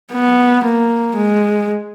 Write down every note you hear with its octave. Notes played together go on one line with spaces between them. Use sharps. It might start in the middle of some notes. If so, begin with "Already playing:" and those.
B3
A#3
G#3